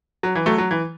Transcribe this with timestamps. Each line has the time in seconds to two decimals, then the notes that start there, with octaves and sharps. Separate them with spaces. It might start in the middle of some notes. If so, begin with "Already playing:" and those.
0.23 F#3
0.35 E3
0.46 F#3 A3
0.58 F#3
0.71 E3